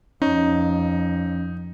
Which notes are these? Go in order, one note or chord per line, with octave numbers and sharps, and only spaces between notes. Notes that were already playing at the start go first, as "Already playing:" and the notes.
F2 C#4 D#4